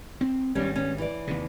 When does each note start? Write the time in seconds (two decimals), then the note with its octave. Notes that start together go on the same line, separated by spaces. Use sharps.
0.21 C4
0.55 G#1 G2 G3 C#4
0.76 C#4
0.98 E3 D5
1.27 D#2 C3